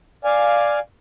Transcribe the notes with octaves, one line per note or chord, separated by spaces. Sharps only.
D5 F5 G#5